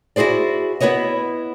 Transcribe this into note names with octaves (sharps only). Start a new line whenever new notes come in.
E4 F#4 G#4 C5 D5
B3 E4 B4 C#5 D#5